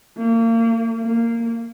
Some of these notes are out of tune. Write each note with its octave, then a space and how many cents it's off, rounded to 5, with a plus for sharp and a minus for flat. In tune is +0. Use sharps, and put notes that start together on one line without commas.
A#3 -35
A#3 -10